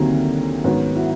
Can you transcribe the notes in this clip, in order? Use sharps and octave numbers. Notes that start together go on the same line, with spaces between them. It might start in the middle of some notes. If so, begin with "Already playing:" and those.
Already playing: D2 C3 D#3 F#3 A#3 C4
G#2 D#3 F#3 B3 C#4
E4 F#4